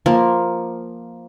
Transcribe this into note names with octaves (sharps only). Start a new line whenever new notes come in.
F3 A#3 A#4